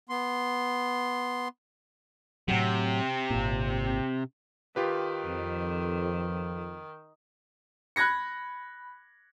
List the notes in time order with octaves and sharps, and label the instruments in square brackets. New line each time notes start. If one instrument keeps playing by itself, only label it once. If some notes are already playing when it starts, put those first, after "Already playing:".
[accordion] B3 C6
[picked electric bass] A2 F#3 [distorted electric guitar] C3
[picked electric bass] G#1 A#2
[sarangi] D#3 [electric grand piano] F4 G4 B4
[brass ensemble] F2
[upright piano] B5 F#6 G#6 A#6 C#7